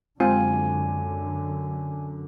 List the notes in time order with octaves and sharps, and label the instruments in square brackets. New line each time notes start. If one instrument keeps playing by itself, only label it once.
[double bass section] F#2 D3 [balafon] G#3 [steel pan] C4 F4 [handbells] G#5